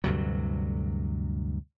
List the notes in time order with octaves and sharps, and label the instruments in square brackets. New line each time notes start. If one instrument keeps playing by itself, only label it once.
[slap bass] D2 G2 C3 F#3